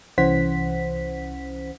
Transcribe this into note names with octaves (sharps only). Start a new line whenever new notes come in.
C2 E3 C#4 C5 F#5 B6